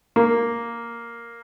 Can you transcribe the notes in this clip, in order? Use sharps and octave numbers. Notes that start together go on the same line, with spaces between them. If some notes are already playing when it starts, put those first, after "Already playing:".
A#3